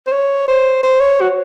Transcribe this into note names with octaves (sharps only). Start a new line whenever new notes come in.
C5
C#5
C5
C5
C#5
F#4